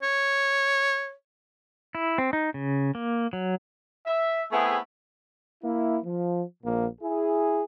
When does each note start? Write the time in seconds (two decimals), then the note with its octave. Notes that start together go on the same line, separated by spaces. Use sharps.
0.03 C#5
1.95 E4
2.18 C4
2.33 D#4
2.54 C#3
2.95 A#3
3.33 F#3
4.07 E5
4.52 A3 B3 C4 E4 G#4
5.63 A#3 E4
6.05 F3
6.63 A#1 A#2 A#3
7.01 E4 G#4